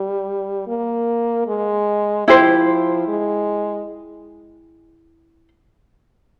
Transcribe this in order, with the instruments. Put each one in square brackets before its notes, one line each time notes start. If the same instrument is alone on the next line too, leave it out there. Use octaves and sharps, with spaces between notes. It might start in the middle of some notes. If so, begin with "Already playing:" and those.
Already playing: [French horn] G3
A#3
G#3
[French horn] F3 [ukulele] E4 G4 C5
[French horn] G#3